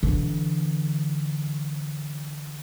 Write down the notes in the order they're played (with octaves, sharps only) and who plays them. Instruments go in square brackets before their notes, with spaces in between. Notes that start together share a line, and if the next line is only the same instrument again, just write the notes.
[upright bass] D3 E3